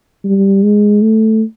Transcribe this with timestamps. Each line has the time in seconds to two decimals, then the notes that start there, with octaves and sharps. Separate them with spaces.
0.24 G3
0.63 G#3
1.02 A3